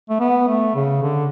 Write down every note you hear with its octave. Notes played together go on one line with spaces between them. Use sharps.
A3
B3
A3
C#3
D3